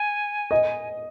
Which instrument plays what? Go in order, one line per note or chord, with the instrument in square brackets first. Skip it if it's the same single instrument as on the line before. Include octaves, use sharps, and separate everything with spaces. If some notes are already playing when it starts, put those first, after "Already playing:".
Already playing: [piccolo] G#5
[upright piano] D#5